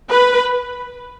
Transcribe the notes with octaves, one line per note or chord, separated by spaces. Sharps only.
B4